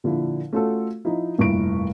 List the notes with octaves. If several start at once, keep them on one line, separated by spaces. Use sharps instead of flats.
A#2 D3 F3 E4
A3 C#4 F4 F#4 A4
F3 D#4 E4
F1 G2 A#2 E4 C#6 D7